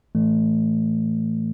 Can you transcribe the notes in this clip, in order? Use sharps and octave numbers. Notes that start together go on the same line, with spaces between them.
A2 E3 A3